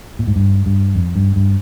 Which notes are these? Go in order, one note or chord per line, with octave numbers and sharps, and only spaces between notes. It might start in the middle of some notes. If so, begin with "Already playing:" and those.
A#2
G#2
G2
G2
F2
G2
G2